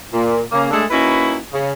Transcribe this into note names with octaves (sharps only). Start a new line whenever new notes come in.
A#2
C#3 A#3
G#3 A3 D4 G#4 A4
A#3 C#4 D#4 E4 F#4 B4
C#3